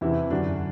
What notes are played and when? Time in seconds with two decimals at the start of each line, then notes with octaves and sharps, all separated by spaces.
0.01 E2 C3 E3 E4
0.30 F#2 D3 D4 F#4